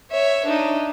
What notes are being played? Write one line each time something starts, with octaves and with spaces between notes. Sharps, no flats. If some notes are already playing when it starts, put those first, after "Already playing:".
C#5 E5
D4 D#4